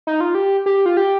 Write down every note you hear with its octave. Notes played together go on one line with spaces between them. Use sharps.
D#4
F4
G4
G4
F4
G4